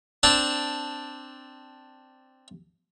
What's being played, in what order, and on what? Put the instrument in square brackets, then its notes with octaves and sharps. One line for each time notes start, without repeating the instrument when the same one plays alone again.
[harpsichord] C4 D4 A5